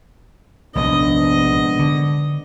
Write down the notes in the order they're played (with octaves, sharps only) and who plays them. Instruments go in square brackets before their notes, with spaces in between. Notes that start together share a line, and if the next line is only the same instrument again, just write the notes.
[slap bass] A#1 C3 [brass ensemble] G#2 B3 D4 [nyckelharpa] D#5
[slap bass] D3